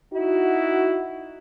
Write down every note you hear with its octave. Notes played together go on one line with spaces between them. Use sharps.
D#4 E4 F#4